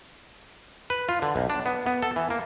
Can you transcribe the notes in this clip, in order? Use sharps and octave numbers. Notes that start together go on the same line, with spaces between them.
B4
F4
D3
B1
D4
B3
B3
A4
E3
A#3